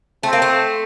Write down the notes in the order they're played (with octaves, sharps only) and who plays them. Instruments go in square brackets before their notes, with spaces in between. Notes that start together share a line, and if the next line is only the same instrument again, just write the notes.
[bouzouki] A3 [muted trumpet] C4
[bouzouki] A#3
A3